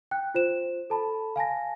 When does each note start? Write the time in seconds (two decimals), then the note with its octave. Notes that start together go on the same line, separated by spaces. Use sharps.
0.11 G5 F#6
0.34 F4 C5 E7
0.90 A4 A5 B5
1.36 F5 G#5 A5 A#6